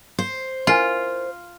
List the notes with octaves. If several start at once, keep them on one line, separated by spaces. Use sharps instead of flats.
C5
E4 F4 A#4 G#5